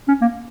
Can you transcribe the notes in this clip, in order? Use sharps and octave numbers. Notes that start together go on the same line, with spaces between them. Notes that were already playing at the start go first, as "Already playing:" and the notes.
C#4
A#3